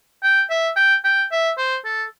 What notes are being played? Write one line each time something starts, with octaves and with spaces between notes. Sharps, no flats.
G5
E5
G5
G5
E5
C5
A4